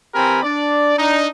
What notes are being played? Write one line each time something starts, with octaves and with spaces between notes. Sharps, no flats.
E3 C4 G4 A#4 G#5 B5
D4 D5
D4 D#4